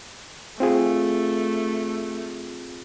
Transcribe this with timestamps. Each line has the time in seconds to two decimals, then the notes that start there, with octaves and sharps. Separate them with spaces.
0.60 A3 C4 F4 G#4